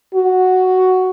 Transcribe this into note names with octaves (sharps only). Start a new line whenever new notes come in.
F#4